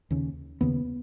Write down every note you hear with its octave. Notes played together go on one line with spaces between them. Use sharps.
D#2 C#3
D#2 C#3 B3